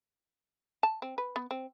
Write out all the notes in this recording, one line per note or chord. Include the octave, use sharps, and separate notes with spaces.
A5
C4
B4
B3
C4